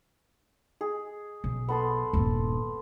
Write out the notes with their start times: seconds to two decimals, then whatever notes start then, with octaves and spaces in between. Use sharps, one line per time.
0.81 G#4
1.44 B1
1.68 B3 A4 C6
2.13 D#1 G2